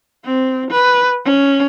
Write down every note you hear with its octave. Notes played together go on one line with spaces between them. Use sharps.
C4
B4
C#4